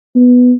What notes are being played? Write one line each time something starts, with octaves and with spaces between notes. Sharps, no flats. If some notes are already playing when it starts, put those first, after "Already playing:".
B3